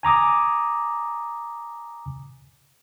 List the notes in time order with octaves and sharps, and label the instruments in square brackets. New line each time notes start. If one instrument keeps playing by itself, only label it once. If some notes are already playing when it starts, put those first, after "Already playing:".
[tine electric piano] G#5 A#5 D6 D#6